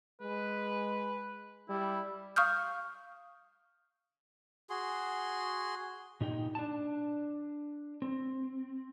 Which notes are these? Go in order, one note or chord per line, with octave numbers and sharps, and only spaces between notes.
G#3 B4
G3 E4
F5 C#6 D#6 F6 G6
F#4 G#4 C6
A#2 D#4 G4 G5
D4 A5
C4